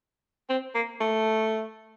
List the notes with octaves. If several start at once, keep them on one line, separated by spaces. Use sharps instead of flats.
C4
A#3
A3